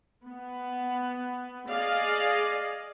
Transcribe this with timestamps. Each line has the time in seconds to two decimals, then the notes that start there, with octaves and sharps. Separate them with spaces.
0.23 B3
1.68 G#4 D5 D#5 F5